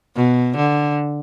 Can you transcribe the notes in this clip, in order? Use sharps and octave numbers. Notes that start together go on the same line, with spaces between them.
B2
D3